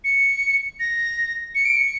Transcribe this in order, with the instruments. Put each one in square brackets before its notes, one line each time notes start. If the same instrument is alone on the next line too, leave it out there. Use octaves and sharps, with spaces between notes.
[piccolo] C#7
A#6
C#7
D7
C#7